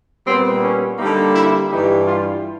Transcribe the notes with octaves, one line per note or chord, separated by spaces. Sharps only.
A#2 G3 B3 C4
C#4
D3 G3 A#3 D#4
E4
G2 E3 G3 D#4
F4